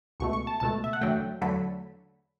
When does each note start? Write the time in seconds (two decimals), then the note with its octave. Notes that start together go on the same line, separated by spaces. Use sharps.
0.20 C#2 B2 A3 C#6
0.33 C#6
0.47 A5
0.60 C#2 B2 A3 A5
0.84 E5
0.93 F#5
1.01 E2 D3 F#3 A3 G5
1.42 E2 D3 F#3 A3 B5